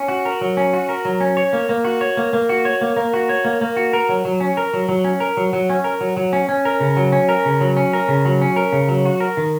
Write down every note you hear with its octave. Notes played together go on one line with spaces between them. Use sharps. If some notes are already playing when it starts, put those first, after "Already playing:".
Already playing: C#4
F#4
A#4
F#3
C#4
F#4
A#4
F#3
C#4
C#5
A#3
A#3
F#4
C#5
A#3
A#3
F#4
C#5
A#3
A#3
F#4
C#5
A#3
A#3
F#4
A#4
F#3
F#3
C#4
A#4
F#3
F#3
C#4
A#4
F#3
F#3
C#4
A#4
F#3
F#3
C#4
C#4
A#4
C#3
F#3
C#4
A#4
C#3
F#3
C#4
A#4
C#3
F#3
C#4
A#4
C#3
F#3
F#4
A#4
D#3